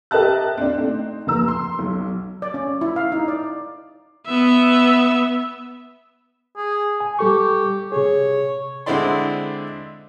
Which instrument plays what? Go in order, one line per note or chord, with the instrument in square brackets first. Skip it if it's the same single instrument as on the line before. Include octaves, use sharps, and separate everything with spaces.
[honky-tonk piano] G4 A#4 D#5 E5 A5 F#6
C4 D4
A3 C4 D#4
F1 A#3 A#5 E6
C6
B1
[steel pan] D5
C#4
E4
F5
D#4
D5
[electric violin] B3 E5
[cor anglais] G#4
[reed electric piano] G#5
[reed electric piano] G3 A4 C#6 [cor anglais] G4
[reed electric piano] C3 G#4 [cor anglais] C#5
[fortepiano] D3 G#3 C4 E4 D5 C6